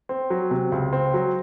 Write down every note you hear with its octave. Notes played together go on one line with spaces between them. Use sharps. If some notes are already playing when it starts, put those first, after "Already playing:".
C4
F#3
C3
C#2
C4
F#3